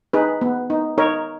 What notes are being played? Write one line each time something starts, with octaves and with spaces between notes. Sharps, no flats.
D#4 G#4 B4
B3
D#4
D#4 A#4 C#5